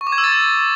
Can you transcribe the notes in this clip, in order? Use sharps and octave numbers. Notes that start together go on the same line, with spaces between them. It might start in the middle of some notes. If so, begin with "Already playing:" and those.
C#6
D6
G#6
E6
A6